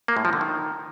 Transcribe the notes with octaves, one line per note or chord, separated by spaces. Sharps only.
A#3
A2
F3
D3
D#3